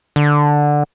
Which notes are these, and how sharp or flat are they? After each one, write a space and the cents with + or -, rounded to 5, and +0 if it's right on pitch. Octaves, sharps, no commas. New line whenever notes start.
D3 +5